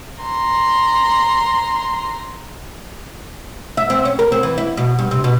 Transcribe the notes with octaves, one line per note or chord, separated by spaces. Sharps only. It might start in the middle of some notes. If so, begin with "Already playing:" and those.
A#5 C6
E5
C4
C#4
A#4
C4
E3
E4
B2
G2
C3
B2